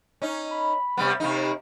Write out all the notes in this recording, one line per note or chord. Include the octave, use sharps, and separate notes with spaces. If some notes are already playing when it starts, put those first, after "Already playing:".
C#4 D#4
B5
C3 G3 B3
C3 A#3 D#4